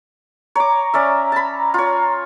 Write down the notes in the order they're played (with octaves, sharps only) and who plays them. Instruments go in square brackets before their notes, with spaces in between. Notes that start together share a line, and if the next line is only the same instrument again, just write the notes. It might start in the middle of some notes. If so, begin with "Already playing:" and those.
[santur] C#5 D6 [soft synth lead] A#5
[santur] C#4 D5 E5
A5 B5
F4 C#5